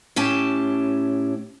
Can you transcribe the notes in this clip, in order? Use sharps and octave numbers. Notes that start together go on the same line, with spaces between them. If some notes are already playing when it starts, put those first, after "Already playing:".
A2 C#4 G4 A5